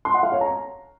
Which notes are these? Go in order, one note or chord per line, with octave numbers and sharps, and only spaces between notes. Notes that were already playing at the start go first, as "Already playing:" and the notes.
C6
F#5
F5
C#5
A#5